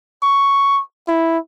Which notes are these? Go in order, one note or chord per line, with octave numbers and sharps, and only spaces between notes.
C#6
E4